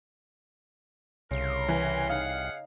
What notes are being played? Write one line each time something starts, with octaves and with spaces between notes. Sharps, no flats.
C2 C#3 A#4 C6
E3
D#4 G#4 F5 F#5